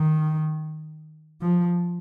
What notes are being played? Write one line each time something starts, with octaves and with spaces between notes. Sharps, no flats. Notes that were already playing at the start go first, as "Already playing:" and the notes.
Already playing: D#3
F3